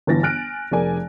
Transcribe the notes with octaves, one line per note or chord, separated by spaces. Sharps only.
G1 E3 A6 A#6
G#5 F6 F#6 D7
F1 G#4 A#4 D5 G#5